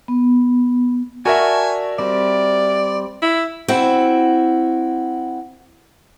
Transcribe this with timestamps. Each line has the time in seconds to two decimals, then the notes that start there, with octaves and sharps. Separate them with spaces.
0.08 B3
1.25 F#4 A#4 D5 E5 G#5 A5 C#6
1.99 G3 C4 D5
3.22 E4
3.68 C4 E4 F#4